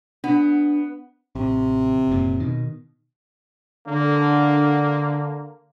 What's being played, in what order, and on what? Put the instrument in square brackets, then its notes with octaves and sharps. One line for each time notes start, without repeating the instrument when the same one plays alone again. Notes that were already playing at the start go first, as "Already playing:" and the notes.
[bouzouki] B3 [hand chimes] D4
[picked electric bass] A1 [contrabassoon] C3
[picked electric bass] F#1 A#2
B2 D#3
[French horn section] D3 [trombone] A#3